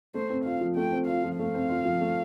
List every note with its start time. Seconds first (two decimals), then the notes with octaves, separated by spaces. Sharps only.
0.14 A3 C5
0.30 C4
0.45 F4 F5
0.61 F3
0.76 A3 G5
0.92 C4
1.07 F4 F5
1.24 F3
1.39 A3 F5
1.54 C4
1.69 F4
1.85 F3
2.01 A3